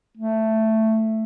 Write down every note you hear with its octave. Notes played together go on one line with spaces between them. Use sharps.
A3